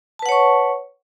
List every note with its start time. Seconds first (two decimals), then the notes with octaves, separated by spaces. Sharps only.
0.19 A5
0.22 B4
0.26 F#5
0.29 C#5
0.32 C#6